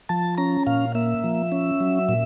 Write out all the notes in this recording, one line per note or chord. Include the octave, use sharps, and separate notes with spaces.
F3 A5
C#4 A#5
A#2 F5
A#3 E5
F3
C#4
F#3
A#2